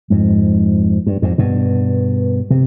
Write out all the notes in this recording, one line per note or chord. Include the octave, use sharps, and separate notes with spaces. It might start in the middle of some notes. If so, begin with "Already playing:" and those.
F2 G#2
G2
F2 G#2
G2 B2
C3